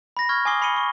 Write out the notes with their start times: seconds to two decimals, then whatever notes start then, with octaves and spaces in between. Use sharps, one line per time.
0.17 B5 A#6
0.29 C#6 F6 G#6
0.45 G#5 D6 D#6 C7 G7
0.62 B5 C7 C#7 D#7 G7
0.76 C#6